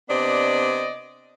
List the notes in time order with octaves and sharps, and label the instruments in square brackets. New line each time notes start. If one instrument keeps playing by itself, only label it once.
[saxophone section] C3 B3 D4 D5 D#5